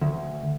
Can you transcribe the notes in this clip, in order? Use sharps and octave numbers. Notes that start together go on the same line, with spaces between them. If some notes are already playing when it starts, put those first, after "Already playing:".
D2